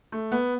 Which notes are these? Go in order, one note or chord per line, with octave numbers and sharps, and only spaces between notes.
A3
B3